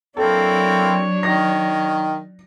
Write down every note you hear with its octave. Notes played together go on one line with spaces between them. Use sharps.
F#3 A#3 C4 D4 E4 A4 C#5
D#3 A#6